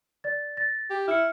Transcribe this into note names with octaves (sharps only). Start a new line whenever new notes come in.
D5 A6
A6 A#6
G4
E4 F6 C#7